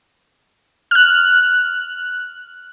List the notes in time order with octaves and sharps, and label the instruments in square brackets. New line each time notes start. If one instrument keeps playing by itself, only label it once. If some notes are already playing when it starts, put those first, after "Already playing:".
[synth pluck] F6 F#6